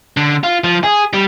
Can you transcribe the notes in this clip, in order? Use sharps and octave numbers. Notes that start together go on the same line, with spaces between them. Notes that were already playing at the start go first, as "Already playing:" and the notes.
D3
F4
F3
G#4
G3